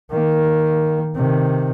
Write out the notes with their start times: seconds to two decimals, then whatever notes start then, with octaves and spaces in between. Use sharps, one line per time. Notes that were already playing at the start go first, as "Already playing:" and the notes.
0.12 D#3 A#3
1.16 C3 D#3